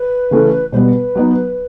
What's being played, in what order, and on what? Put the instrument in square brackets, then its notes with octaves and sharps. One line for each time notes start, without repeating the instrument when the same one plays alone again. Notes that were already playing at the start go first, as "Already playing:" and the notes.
Already playing: [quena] B4
[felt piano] C#3 E3 A3 C#4 E4
[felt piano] B2 G3 B3 [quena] B4 C5
[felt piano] F#3 B3 D#4